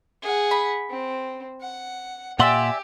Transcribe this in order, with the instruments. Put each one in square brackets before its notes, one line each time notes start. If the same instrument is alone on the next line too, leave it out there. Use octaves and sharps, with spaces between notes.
[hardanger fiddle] G#4 F#5
[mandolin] B5
[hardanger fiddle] C4
F#5
[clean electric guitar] A#2 F#5 C6 [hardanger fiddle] G4 [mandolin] D5 E5 G#5